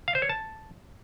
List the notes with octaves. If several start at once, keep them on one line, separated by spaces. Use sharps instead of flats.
F5
C5
C#5
A5